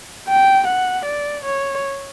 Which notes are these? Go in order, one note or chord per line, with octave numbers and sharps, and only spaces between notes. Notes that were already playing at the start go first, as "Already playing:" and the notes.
G5
F#5
D5
C#5